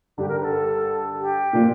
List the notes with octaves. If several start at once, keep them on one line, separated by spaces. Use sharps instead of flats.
G2 D3 G3 D4 G4
A#4
B4
A4
G4
A#2 F3 A#3 D4 F4